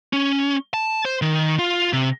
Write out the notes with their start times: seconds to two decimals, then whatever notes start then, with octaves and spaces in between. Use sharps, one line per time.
0.13 C#4
0.74 A5
1.05 C5
1.22 D#3
1.59 F4
1.93 C3